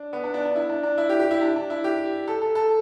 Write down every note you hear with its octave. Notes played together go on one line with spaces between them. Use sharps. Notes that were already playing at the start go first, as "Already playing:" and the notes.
Already playing: D4
B3
D4
D4
D4
E4
D4
D4
E4
G4
G4
E4
D4
D4
E4
G4
A4
A4
A4